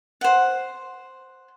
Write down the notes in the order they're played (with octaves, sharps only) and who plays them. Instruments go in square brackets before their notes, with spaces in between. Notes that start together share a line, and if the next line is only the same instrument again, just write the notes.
[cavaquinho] C5 F#5